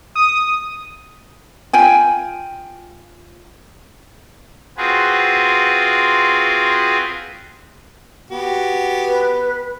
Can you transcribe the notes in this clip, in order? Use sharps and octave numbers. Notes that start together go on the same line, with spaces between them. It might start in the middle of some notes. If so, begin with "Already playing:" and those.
D#6
F4 G5 G#5
C4 F4 F#4 G#4 B4
B3 F#4 G4
B4